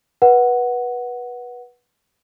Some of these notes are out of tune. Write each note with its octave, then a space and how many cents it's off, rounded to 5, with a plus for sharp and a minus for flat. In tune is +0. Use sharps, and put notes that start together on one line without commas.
B4 -20 F#5 +0